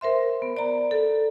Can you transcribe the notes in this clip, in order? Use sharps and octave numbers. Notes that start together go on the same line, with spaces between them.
A#4 C5 E5 C6
B3
D5 A#5
A4